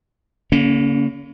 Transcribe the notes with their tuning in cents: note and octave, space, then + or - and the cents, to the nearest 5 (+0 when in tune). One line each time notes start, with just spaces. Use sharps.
D3 -45 A#3 +0 C#4 +15